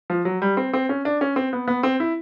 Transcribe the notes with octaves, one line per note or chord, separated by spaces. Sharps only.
F3
F#3
G3
C4
C4
C#4
D4
C#4
C4
B3
B3
C4
E4